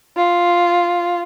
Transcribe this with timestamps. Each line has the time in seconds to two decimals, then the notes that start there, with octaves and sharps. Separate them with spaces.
0.16 F4